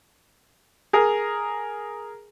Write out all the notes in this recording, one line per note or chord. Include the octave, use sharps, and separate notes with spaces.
G#4 A#4